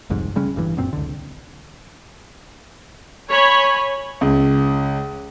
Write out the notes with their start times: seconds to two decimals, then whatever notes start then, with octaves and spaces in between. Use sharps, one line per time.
0.10 G1 C2 F2 G#2
0.36 C#3 G3 G#3 C#4
0.56 A1 G2 E3
0.76 E1 F#2 A#2 C4
0.93 C#2 D3
3.30 C#5 G#5 B5
4.21 C#2